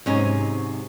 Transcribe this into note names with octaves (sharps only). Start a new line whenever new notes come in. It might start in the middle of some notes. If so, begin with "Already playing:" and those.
G#2 C3 F#3 C#4 D#5